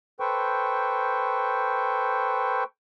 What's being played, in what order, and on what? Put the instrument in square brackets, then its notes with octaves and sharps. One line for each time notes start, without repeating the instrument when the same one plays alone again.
[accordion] A4 B4 C5 G5 C#6